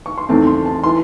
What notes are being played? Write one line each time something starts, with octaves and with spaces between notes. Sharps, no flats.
C#6
C6
E2 D#3 A3 C4 A5
C6
A5
E3 C6